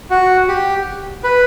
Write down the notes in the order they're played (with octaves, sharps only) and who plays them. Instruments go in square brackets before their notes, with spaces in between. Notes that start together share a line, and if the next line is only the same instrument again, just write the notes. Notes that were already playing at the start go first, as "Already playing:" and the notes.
[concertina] F#4
G4
B4